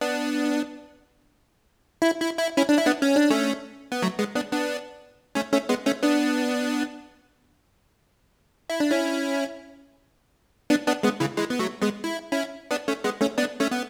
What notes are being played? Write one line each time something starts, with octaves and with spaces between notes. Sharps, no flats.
B3 D4
E4
E4
E4
C#4 E4
D4
E4
B3 D4
C#4
D4
A3 C#4
B3
F#3 A3
G#3 B3
B3 D4
B3 D4
A3 C#4
A3 C#4
G#3 B3
A3 C#4
B3 D4
E4
D4
C#4 E4
B3 D4
B3 D4
G#3 B3
C#3 E3
E3 G#3
B3
F#3 A3
G#3 B3
E4
C#4 E4
B3 D4
A3 C#4
G#3 B3
A3 C#4
B3 D4
A3 C#4
B3